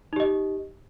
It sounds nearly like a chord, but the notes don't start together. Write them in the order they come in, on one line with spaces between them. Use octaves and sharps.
D#4 G4 D#5